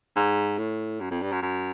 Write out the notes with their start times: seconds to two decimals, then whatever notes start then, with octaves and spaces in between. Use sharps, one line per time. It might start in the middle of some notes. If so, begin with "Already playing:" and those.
0.16 G#2
0.58 A2
1.01 F#2
1.11 F2
1.22 G2
1.32 F#2
1.42 F#2